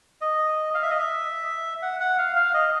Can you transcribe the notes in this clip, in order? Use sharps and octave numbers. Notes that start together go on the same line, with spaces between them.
D#5
F5
E5
D#5
E5
F#5
F#5
F5
F5
D#5